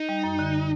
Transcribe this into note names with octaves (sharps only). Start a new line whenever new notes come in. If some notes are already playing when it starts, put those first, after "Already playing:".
Already playing: D#4
G3
F#2
D3